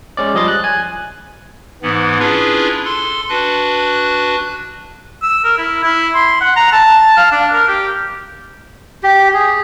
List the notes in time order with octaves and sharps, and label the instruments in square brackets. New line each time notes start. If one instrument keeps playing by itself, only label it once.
[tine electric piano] G#3 C#4 D5
F3 G3 D#5 C6 A6
F#6
G#5
[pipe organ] G#2 E3 B3
C#4 D4 E4 F4 G#4 B4
A4 C6
D4 F#4 B4 F#6
[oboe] E6
A#4
E4
E4
C6
F#5
A#5
A5
F5
D4
A#4
G4
[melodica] G4
G#4